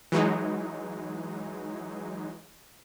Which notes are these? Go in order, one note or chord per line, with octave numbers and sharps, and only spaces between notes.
E3 F#3 G#3 D#4